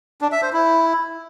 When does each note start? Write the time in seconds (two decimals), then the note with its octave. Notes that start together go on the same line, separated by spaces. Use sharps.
0.21 D4
0.32 E5
0.42 C5
0.53 E4